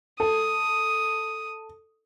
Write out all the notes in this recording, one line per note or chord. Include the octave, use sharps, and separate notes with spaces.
A4 D#6